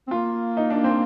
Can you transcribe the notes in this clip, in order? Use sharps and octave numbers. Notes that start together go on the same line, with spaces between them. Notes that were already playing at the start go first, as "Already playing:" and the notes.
C4
A#3 F4
D#4
D4
C4